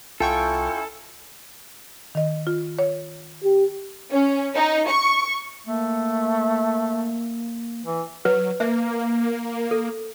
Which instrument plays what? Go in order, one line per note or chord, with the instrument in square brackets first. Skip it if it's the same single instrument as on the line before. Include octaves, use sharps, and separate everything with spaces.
[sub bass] C2 [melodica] C#4 E4 [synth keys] F4 G5 C#6 [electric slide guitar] A4
[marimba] D#3 D#5
F4
C#5
[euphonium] G4
[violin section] C#4
D#4
C#6
[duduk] A3 [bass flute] A#3
[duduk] E3
[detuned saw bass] F#3 [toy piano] B4
[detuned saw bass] A#3 [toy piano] E5
[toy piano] A4